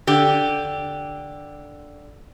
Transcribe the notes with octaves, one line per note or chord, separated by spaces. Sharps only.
D3 G4